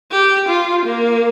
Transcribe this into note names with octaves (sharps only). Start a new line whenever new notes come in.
G4
F4
A#3